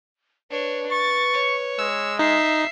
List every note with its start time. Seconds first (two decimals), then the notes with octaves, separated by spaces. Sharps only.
0.51 D4 B4 C#5
0.92 C#6 A6
1.34 C#5
1.79 G#3 E6
2.19 D#4 E5 C7